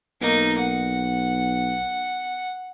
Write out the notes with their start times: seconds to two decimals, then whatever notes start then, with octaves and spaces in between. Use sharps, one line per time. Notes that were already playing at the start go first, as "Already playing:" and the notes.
0.21 B1 A#3 D#4
0.59 F#5